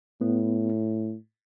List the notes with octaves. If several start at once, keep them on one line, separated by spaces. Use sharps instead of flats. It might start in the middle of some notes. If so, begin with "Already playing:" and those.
A2 B3